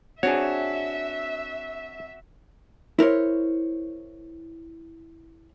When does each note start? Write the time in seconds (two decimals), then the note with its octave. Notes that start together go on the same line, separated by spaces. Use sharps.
0.23 C4 D4 F#4 G#4 C#5 E5
2.99 E4 A#4 C5 C#5